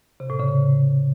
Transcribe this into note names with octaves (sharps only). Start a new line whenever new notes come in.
C3
A2
C#3